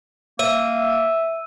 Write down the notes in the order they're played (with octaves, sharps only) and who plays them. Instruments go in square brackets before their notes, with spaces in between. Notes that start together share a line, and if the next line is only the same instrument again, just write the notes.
[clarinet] A#3 [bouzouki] E5 [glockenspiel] E6 D#7